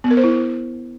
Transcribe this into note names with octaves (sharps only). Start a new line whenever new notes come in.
B3
A#4
C5
E4